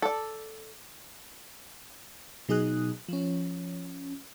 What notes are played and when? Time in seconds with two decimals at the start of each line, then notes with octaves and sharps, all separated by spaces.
0.02 A4 D5
2.48 B2 F#3 D#4 G#4 D#6 F#6
3.09 F3 C#4